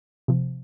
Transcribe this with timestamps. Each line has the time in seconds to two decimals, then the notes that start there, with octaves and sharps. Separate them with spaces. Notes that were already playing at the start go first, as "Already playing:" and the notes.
0.28 C3 F3